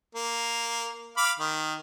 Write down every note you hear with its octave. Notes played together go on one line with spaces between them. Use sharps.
A#3
F5 B5 D6
D#3